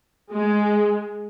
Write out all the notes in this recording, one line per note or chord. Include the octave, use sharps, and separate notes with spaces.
G#3